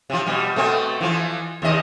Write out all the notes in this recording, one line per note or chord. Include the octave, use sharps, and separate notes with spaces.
C3 F3
B2 G3
B2 A3 C4
E3 F3
D#2 C3 D#5